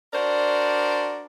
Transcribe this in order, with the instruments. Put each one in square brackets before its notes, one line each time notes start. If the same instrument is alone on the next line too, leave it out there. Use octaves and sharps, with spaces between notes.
[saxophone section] D4 F#4 A#4 C5 D5